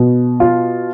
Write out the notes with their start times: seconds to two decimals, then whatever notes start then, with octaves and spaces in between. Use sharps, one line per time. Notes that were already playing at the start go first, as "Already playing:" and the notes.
Already playing: B2
0.40 F4